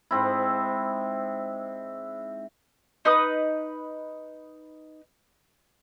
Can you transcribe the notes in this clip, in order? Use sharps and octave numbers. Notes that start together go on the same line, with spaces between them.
G#2 C4 E4
D#4 B4 B5 D#6